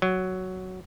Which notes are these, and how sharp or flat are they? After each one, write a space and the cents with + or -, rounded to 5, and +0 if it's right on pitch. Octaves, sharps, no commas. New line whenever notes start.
F#3 +5